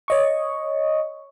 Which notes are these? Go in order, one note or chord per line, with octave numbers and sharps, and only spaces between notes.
C#5 D#5 C#6